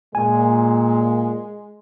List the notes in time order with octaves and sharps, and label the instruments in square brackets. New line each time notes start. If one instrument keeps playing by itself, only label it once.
[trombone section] A#2 [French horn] G#3 [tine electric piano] G#5